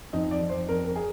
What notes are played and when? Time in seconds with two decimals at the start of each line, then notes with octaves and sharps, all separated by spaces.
0.13 F2 D#4
0.31 D5
0.41 F2
0.50 C5
0.68 F2 A#4
0.84 A#4
0.96 G#4